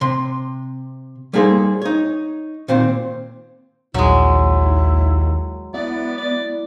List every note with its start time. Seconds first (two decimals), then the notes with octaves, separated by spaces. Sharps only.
0.01 C3 C6
1.33 G3 A#3 D#4 G#4 A4 C5
1.82 D#4 C#5
2.68 A#2 D#3 C4 C5
3.94 A#1 D#2 F#3 G#3 E4
5.74 B3 E4 D5
6.18 D5